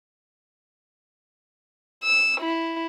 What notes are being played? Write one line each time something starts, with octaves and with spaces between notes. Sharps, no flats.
E6
E4